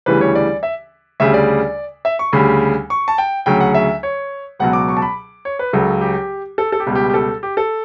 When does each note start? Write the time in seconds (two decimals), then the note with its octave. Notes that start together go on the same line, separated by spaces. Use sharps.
0.06 D2 C#3 E3 G3 B4
0.21 C#5
0.35 D5
0.63 E5
1.20 D2 C#3 G3 E5
1.34 D5
2.05 E5
2.19 C#6
2.33 D2 C#3 G3 B5
2.90 C#6
3.08 A5
3.18 G5
3.46 D2 C#3 F#3 G5
3.60 F#5
3.74 E5
4.03 C#5
4.59 C#2 B2 F#3 F#5
4.73 D6
4.89 C#6
4.97 A5
5.02 B5
5.45 C#5
5.59 B4
5.73 C#2 C#3 F#3 A4
6.01 G4
6.58 A4
6.72 A4
6.80 G4
6.86 C#2 B2 G3
6.95 G4
7.10 G4
7.14 A4
7.43 G4
7.57 A4